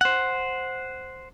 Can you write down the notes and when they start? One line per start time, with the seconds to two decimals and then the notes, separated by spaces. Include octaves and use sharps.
0.01 C5 F#5